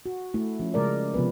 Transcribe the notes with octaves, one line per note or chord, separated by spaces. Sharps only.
F#4
A3 E4
F3 C#4
C#3 G#3 A#4 D5
C3 F3 B3 B4